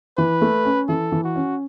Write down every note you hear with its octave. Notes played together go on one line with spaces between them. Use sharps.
E3 B4
A3
C#4
E3 A4
E3
F#4
C#4